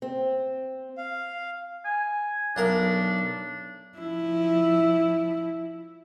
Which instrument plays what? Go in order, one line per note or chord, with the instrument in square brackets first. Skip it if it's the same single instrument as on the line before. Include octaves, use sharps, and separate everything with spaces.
[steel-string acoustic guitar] C4
[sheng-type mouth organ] F5
[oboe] G#5
[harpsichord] B1 A#4 [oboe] D4
[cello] F3 E4